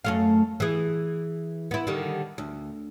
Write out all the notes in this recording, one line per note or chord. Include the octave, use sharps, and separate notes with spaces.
F#2 A3 F5
E3 G#4
B3 E4
D3 D#3 G3
D2